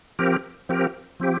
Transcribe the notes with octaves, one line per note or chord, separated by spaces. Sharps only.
F3 C4 G4 A#4
F3 C4 G4 A#4
F3 C4 G4